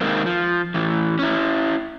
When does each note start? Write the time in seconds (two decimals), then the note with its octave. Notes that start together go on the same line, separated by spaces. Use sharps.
0.01 C3 D#3 G#3 A#3 C4
0.26 F3
0.74 A2 E3
1.19 C#4 E4